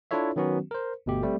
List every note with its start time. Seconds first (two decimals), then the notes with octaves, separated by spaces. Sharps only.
0.11 D4 E4 F4 A4 C#5 E5
0.36 D#3 F#3 B3 C#4 F#4
0.71 A#4 C5
1.06 G1 B2 A3 G4
1.23 G3 A3 C4